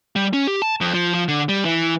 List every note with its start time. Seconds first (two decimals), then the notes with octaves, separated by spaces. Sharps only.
0.16 G3
0.33 C#4
0.48 G4
0.62 A5
0.81 F2
0.94 F3
1.14 F3
1.28 D3
1.49 G3
1.65 E3